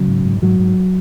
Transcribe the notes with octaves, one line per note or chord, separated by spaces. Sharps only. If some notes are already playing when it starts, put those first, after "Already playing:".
Already playing: C#3 F#3
G#2
G#2
G#2 F#3
G#2